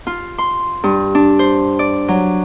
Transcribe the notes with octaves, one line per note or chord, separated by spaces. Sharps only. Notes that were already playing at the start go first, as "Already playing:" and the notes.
F4
C6
G2
D4
C5
D5
F#3